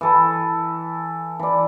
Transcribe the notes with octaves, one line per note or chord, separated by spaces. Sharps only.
E3 A4 B4
E3 D5